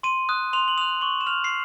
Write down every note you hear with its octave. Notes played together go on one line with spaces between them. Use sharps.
C6 D#7
D#6 F#6
C6 F7
F#7
D#6 F#6 F7
C#6 F#7
E7
F6 F7
C7